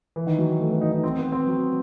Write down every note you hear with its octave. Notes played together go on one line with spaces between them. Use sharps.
E3
D#3
F#3
A3
B3
D#4
D#4
C4
B3
C4
F#3